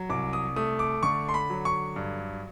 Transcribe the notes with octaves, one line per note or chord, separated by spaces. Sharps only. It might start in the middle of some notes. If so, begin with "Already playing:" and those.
Already playing: F#3
C2 D6
D#6
A3 D#6
D6
D3 C#6
C6
B5
F#3
C#6
G2